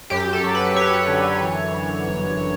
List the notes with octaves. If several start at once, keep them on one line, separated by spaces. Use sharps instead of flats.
F#2 G4
A4
F#3
B4
F#2 C#5
D3
E3
E3
G1